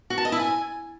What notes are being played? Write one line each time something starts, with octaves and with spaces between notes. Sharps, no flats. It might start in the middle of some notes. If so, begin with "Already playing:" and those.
F#4
A5
D#5
E4
G#5